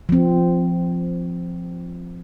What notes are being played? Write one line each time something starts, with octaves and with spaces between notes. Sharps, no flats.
F3 C4